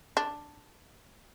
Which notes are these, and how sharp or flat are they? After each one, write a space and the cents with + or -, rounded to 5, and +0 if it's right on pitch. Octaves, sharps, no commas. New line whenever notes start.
D4 +5